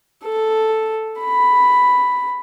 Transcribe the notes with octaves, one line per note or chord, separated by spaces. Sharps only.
A4
B5